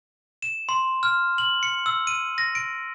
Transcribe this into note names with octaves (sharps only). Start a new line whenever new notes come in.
E7
C6
F6
F#7
C#7
E6
D#7
A#6
D7